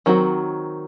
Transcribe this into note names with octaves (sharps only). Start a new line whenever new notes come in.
D#3 F#3 C4 F#4